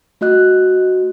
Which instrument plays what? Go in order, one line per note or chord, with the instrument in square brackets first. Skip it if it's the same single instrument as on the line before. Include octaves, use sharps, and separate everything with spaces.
[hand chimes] A3 F#4 D#5 F#6